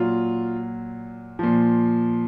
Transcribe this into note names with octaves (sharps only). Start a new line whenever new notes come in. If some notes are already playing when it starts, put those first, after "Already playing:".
Already playing: A#2 F#3 F4
A#2 F3